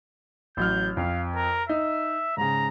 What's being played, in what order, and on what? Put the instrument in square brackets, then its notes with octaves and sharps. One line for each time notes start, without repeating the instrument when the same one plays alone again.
[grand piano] A1 F#3 F6 [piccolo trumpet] G6
[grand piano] F2 [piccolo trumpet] F5
[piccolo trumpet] A#4
[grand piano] D#4 [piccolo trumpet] E5
[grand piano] G#2 C#3 [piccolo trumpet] A#5